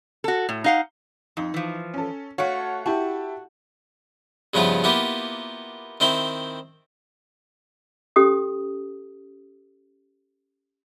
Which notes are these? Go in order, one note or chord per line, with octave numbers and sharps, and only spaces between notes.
F#4 A4
A2
D#4 F5 F#5
F2 D#4
E3 F3
C#4 A4
A3 F#4 C#5 F5 F#5
E4 F#4 G4 A5
G2 C#3 F3 B3 E4 F4
A#3 B3 E4 F4 G4
D#3 C4 E4 G5
C#4 G4 A4 D#6